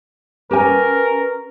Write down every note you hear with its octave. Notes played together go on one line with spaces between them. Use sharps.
C#4 G4 A#4 B4 G#5